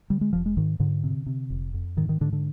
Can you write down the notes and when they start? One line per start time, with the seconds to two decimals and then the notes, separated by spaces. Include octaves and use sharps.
0.10 D3 G3
0.21 G#3
0.33 F1 F3
0.46 G#3
0.57 G#2 D#3
0.80 G#2 D3
1.04 C3
1.26 C3
1.50 F1
1.74 F2
1.97 G#2 D#3
2.09 D#3
2.21 G#2 D3
2.33 D3